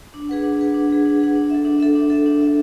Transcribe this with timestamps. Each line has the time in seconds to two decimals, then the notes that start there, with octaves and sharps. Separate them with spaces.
0.14 D4
0.29 G#4 B4 F#5
0.44 D4
0.59 G#4 B4 F#5
0.74 D4
0.90 G#4 B4 F#5
1.05 D4
1.20 G#4 B4 F#5
1.35 D4
1.50 A4 E5
1.65 D4
1.80 A4 E5
1.95 D4
2.10 A4 E5
2.26 D4
2.40 A4 E5